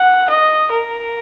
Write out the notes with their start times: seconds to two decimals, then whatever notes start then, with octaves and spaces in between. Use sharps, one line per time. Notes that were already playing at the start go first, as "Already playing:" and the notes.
Already playing: F#5
0.30 D#5
0.71 A#4